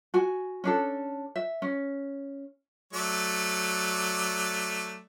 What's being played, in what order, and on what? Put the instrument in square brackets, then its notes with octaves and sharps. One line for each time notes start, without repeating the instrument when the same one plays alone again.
[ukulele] F#4 G#5
C#4 D4 A4
E5
C#4
[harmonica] F#3 A3 D5